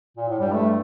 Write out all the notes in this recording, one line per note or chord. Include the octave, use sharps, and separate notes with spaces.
A#2
A2
G2 G3
A3